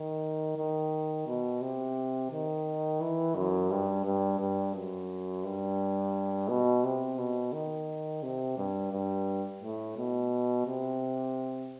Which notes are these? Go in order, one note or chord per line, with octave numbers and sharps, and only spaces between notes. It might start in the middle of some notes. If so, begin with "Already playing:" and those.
Already playing: D#3
D#3
B2
C3
D#3
E3
F#2
G2
G2
G2
F#2
G2
B2
C3
B2
D#3
C3
G2
G2
A2
B2
C3